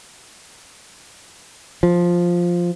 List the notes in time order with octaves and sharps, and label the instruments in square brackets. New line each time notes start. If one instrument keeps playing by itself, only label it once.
[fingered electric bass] F3